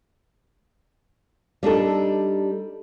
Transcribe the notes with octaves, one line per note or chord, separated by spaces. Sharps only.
G3 D4 D#4 A4